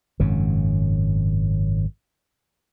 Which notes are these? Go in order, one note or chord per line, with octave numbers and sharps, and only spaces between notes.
G#1 F#2 C#3